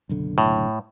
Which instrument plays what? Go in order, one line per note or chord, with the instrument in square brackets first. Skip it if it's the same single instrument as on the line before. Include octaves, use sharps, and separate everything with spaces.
[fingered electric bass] F#1 B1 D3
[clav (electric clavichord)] A2